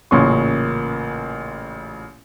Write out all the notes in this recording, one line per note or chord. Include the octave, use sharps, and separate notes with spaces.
A1 A#2 C#3 A#3 C6 C#6